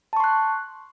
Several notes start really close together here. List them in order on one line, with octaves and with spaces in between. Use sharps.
A5 C#6 C6 F#6